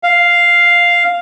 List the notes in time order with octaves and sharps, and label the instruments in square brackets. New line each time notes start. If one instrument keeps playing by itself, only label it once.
[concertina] F5